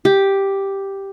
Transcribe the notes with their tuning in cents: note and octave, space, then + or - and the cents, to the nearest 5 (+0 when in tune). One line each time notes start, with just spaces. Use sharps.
G4 +0